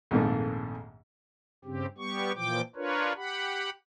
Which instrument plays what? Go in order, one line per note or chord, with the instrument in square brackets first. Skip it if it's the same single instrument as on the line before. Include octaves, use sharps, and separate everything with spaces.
[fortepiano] A#1 F2 G#2 D#3 A3 A#3
[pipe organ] G2 C#3 C4 G4
G3 B3 G4 C#6
A#2 E3 F3 G5 D6
D4 F4 A#4 B4 C#5
G4 F#5 B5